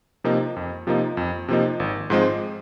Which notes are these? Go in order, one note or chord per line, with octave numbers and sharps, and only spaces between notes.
C3 F3 A#3 D#4
F2
C3 F3 A#3 D#4
F2
C3 F3 A#3 D#4
G#1
G#2 F3 G#3 C4